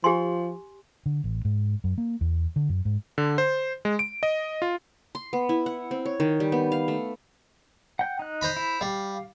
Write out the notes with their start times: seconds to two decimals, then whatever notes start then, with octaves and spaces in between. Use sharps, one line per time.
0.04 F3 G4 G#5 C6
1.06 D3
1.24 A1
1.45 G#2
1.84 F#2
1.98 A#3
2.21 E2
2.56 D3
2.69 F#2
2.85 G#2
3.18 D3
3.38 C5
3.85 G#3
3.99 D7
4.23 D#5
4.62 F4
5.15 C6
5.33 B3
5.49 E4
5.66 F#5
5.91 C4
6.06 C#5
6.20 D#3
6.40 G3
6.52 B3
6.72 F5
6.88 A3
7.99 F#5 G5
8.19 D#4 F#6
8.41 C5 A#5 B5
8.56 E4
8.81 G3 F5